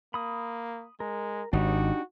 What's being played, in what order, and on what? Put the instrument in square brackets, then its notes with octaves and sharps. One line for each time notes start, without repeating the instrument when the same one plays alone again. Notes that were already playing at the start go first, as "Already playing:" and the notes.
[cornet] A#3 [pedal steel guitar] B5 D#6
[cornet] G#3 [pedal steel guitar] A#4
[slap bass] G#1 [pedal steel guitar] D4 D#4 G4 [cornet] F#4